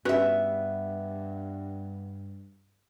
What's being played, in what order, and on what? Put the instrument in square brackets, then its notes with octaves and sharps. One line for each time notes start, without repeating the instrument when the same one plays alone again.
[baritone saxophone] G2 [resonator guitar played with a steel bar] B3 E5 [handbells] C#4 F#4 B4